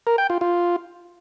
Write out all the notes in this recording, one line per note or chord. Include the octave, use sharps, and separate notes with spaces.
A#4
G5
F4
F4